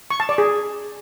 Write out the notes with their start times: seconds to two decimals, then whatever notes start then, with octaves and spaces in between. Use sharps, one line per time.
0.11 C#6
0.20 A5
0.29 D5
0.38 G#4